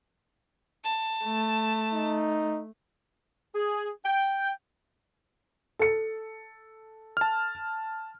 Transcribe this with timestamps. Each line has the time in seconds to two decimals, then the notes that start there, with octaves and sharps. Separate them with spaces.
0.84 A5
1.24 A3
1.92 D#4
3.55 G#4
4.05 G5
5.79 A4 C#7
7.17 A5 F6